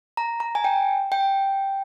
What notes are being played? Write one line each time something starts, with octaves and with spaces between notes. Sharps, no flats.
A#5
A#5
G#5
G5
G5